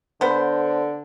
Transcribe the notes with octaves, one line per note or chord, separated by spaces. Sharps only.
D3 B3 C5